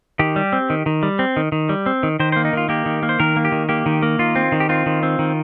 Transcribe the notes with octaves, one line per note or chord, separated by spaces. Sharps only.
D#3 G4
G3
C4
D#3
D#3
G3
C4
D#3
D#3
G3
C4
D#3
D#3 C5
C5
A#3
D#4
D#3 F4
A#3 G4
D#3
A#3
C5
D#3 A#4
A#3
G4
D#3
A#3 G4
D#3
A#3
D#3 F4
C4
D#3
G4
C4 F4
D#3
C4
D#3